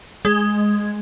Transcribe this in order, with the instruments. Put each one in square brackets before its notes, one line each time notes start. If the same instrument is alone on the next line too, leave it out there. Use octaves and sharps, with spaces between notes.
[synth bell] G#3